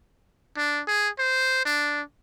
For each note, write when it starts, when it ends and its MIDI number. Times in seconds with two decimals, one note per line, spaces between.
0.57 0.82 62
0.88 1.09 68
1.19 1.63 72
1.65 2.01 62